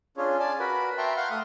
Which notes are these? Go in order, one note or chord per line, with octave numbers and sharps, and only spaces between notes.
C#4 D4 F4 G#4 C#5
D5 G#5 A5
F#4 A#4 B4 B5
E5 G5 A5 A#5 C6 C#6
F5 F#5 C6 C#6 F6 G6
A3 D#6